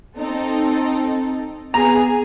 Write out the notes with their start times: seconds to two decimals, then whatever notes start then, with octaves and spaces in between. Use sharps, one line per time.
0.16 C4 D#4 A4
1.74 B3 G#4 A#5